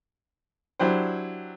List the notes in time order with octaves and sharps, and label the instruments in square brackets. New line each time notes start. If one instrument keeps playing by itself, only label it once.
[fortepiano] F#3 D4 E4 G4 C5